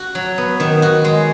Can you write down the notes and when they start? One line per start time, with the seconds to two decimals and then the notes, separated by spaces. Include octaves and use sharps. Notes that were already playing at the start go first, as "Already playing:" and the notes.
Already playing: F#4
0.15 F#3
0.38 B3
0.60 D#3
0.82 F#4
1.04 G#3